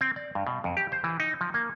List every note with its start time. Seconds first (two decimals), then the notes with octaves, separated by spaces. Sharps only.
0.01 C4
0.16 D5
0.35 G2
0.47 B2
0.64 F2
0.77 G4
0.92 C5
1.04 E3
1.20 D#4
1.41 F3
1.54 A#3